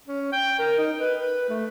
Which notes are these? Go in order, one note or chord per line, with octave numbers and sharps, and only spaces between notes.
C#4
G5
A#4
D#4
B4
B4
A3